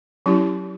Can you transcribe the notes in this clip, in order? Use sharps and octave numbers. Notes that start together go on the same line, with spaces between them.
F#3 C#4 E4 G4